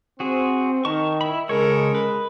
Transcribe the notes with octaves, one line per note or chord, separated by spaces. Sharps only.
C4 F#4 G#4
D#3 A#4 A5 C#6
E4 B5
C#3 G#3 A4 A#4 C#5
B4